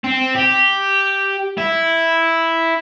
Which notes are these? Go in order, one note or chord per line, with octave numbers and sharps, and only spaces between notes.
C4
G4
E4